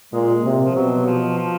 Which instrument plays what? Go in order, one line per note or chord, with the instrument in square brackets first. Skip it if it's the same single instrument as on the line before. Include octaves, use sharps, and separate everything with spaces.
[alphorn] A#2 [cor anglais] G#3
[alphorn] C3
[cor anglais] F3
[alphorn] B2 [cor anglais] F#3
[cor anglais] F3
F3